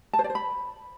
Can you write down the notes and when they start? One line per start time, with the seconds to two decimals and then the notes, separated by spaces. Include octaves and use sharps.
0.13 A5
0.19 C5
0.24 D5
0.30 C5
0.35 B5